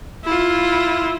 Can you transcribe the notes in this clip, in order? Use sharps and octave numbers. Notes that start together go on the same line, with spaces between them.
E4 F4